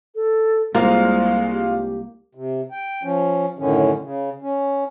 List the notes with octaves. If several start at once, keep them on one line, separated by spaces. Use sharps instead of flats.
A4
C2 G#3 A#3 F4 C5 F5
G4
C3
G5
F3 C#4
F#2 A2 D3 D#3 C#4
C#3
C#4